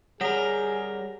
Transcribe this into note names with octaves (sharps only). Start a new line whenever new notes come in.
G3 G#4 A#4 C#5 F#5 A#6